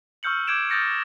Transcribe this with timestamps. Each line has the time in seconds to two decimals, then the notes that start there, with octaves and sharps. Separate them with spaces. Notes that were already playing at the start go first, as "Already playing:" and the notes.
0.23 C#6 E6 F6 G6 C#7 F#7
0.47 D6 G6 G#6 D7 E7
0.70 D#6 F6 G6 A6 A#6 C#7